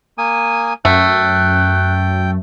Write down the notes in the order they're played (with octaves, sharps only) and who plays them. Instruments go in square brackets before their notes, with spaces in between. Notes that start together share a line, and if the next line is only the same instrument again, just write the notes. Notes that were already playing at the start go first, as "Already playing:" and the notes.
[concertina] A#3 G#5 D#6
[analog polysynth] F#2 [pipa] A3 [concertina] G5 [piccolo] F#6